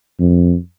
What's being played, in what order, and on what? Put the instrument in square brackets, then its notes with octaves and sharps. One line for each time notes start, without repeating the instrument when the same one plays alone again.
[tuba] F2